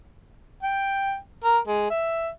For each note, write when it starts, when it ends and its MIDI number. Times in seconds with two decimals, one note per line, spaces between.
0.63 1.17 79
1.44 1.58 70
1.67 1.89 56
1.90 2.29 76